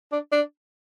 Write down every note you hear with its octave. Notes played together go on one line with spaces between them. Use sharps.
D4
D4